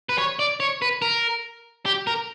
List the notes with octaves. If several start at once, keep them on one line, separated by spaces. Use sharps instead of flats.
B4
C#5
D5
C#5
B4
A#4
G4
A#4